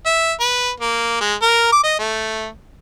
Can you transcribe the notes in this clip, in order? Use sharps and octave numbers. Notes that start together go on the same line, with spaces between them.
E5
B4
A#3
G#3
A#4
D6
D#5
A3